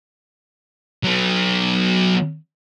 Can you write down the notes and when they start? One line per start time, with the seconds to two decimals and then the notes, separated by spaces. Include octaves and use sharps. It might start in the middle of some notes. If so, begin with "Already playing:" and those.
1.04 F#3 B3